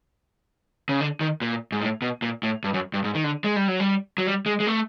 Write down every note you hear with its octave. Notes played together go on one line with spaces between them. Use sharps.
C#3
D3
D#3
A#2
G#2
A2
B2
A#2
A2
G2
F#2
G2
G#2
D#3
D3
G#3
G3
F#3
G3
F#3
G3
G#3
G#3
A3